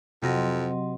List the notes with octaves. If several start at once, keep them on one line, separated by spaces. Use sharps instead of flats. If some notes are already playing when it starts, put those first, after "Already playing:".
F2 C3 F#3 C4 F#4 D#5 C6